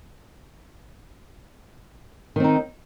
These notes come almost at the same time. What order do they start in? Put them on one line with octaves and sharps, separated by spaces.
D#3 C4 D#4